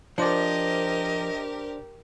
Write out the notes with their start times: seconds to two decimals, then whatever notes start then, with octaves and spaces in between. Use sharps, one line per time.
0.18 F3 D4 G4 A#4 C5 D5 D#5